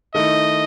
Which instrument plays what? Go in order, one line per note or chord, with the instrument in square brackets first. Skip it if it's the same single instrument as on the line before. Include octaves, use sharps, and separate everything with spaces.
[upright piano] D#3 A3 E4 [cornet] D#5